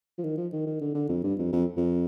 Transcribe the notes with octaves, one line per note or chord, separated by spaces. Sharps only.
F3
D#3
F3
D#3
D#3
D3
D3
F2
G2
F2
F2
F2